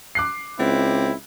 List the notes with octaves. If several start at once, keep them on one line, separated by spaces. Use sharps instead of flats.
D6 F#6 C7
C#2 C4 E4